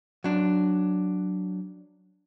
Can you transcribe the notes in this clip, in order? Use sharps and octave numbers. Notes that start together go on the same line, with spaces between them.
F#3 D4